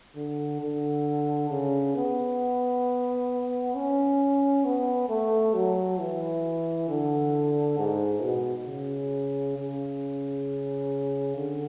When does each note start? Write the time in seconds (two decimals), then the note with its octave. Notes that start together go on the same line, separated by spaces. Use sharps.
0.16 D3
0.61 D3
1.50 C#3
1.96 B3
3.75 C#4
4.65 B3
5.09 A3
5.54 F#3
5.99 E3
6.89 D3
7.78 G#2
8.22 B2
8.68 C#3
9.57 C#3
11.37 D3